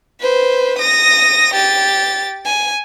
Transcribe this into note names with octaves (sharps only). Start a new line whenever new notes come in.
B4 C5
D#6 A#6
G4 A6
G#5